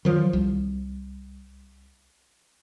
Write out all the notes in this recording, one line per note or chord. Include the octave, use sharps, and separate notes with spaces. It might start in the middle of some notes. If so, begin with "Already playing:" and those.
D#3 F3 F#3
C2